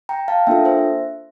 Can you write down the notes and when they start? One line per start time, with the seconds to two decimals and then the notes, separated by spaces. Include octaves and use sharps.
0.09 G5 A#5
0.28 F5 A5
0.47 A#3 D4 F4 A4 E5 G5
0.65 C5 E5